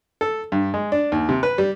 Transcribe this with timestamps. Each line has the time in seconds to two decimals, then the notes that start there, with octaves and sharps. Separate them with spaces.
0.21 A4
0.52 G2
0.74 G#3
0.92 D4
1.12 D#2
1.29 C3
1.43 B4
1.58 G3